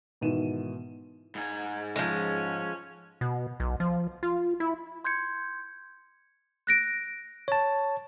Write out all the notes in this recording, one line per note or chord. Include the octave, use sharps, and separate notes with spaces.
G#2 B2 D#3 E3 D#7 E7
G#2 G#5
F3 G#3 C#4
B2
B1
F3
F4
E4
C6 G6 G#6 C#7
F#6 A#6 D7
C#5 A5